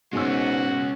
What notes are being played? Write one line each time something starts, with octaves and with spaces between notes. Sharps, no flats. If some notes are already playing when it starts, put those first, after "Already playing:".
G#2 B2 G#3 C#4 F#4 G#5 E6